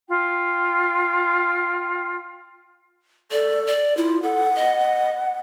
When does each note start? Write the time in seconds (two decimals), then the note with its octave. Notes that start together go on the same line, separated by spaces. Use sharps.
0.09 F4 G5
3.32 A4 D5
3.67 D5
3.97 E4 F4
4.23 A4 F#5
4.55 D#5